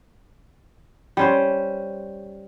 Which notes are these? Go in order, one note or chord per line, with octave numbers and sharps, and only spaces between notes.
G3 C#4 C5